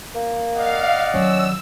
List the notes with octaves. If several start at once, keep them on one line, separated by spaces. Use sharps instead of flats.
A#3
D5 D#5 F5 F#5
D#3 F#3 C#4 E6